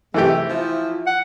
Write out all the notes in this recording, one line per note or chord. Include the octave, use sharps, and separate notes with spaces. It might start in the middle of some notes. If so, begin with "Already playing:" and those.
C3 E3 F#3 G#3 A3 G4
F3 E4
F#5